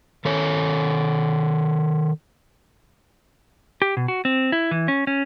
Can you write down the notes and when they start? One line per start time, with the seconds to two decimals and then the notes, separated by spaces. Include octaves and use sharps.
0.25 D#3 A4 C#5
3.82 G4
3.97 B2
4.08 F#4
4.25 C4
4.52 E4
4.71 E3
4.88 C#4
5.07 C#4